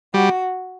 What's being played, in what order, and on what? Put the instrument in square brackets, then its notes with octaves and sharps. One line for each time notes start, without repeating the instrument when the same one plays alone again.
[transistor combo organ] G3 [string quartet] F#4